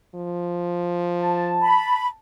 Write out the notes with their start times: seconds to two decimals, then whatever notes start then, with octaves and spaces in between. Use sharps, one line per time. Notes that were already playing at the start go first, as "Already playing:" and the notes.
0.15 F3
1.21 A5
1.61 B5